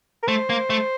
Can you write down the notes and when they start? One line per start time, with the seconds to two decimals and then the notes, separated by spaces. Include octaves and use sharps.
0.23 A#4
0.28 A3 C5
0.50 A#3
0.70 A3